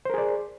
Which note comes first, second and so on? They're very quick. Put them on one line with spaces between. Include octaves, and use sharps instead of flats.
C5 A#4 G#4 D5